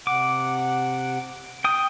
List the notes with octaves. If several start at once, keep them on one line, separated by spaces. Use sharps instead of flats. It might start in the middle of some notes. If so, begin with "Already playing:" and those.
C3 F#5 D6
G5 D#6